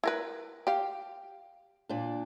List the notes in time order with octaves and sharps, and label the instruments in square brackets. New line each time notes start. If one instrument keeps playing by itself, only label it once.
[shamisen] E4 A#4 B4
G4 F5
[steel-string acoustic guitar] A#2 D4